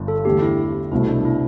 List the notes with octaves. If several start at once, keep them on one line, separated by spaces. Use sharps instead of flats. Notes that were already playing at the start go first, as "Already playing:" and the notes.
Already playing: G1 G2 D3
A4
E2 D3 A3 D4 G4
E4
C2 B2 A3 E4
D4
E4